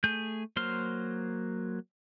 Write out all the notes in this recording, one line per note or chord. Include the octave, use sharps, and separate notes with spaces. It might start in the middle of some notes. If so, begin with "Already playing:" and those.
A3 G#4 G6
F#3 A#3 C5 C6 F6